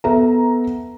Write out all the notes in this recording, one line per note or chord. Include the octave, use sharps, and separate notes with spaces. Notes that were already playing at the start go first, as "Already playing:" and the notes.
B3 A4 B4 E5 A#5